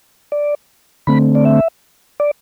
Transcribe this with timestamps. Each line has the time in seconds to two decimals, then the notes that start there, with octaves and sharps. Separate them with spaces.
0.32 D5
1.07 D3 A3 C4 B5
1.35 D5
1.45 E5
2.20 D5